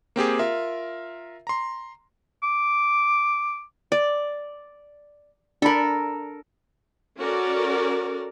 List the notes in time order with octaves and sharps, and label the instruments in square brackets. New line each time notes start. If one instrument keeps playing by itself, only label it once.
[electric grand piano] A#3 C4 G4 G#4
F4 A#4 E5
A#5 C6
[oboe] D6
[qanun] D5
[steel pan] D4 B5 [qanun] A4 A#4
[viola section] C#4 F#4 A4 A#4 D5